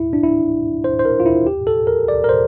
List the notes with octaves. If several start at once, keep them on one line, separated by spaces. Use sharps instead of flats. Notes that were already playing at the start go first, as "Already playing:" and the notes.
Already playing: E4
D4
E4
C5
C5
A#4
F4
E4
G4
A4
A#4
D5
A#4
C5